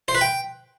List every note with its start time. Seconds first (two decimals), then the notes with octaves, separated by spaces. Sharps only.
0.08 C5
0.15 B4
0.21 G5